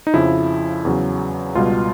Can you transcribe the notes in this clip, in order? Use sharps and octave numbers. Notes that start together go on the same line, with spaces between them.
D#4
F2 C#3 F3 E4
E2 C#3 F#3
C#2 B2 G3 F4